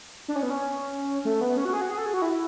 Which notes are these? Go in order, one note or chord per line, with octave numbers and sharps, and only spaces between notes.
D4
C#4
B3
C#4
A3
B3
C#4
F#4
G#4
F#4
G#4
A4
G#4
F#4
E4